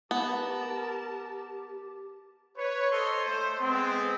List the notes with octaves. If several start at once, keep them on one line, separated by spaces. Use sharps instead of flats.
B3 G4 A#4 A5
B4 C#5
A4 C5 C#5 D#5 C6
A3 C5
G#3 B3 C4